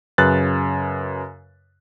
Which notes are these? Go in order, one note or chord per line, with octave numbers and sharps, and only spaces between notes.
F#2 C#3 B4 F#6 A6